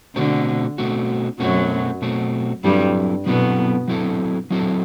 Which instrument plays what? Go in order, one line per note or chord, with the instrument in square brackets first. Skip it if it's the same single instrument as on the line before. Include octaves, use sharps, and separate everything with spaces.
[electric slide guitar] B2 A3 C4 F#4 [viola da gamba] D3
[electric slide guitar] B2 A3 C4 F#4
[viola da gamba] F#2 F#3 [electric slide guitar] B2 A3 C4 F#4
[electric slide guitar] B2 A3 C4 F#4
[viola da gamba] G2 G3 [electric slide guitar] F#3 C4 E4 A4
[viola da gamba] B2 B3 [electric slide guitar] F#3 C4 E4 A4
[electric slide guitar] F#3 C4 E4 A4
F#3 C4 E4 A4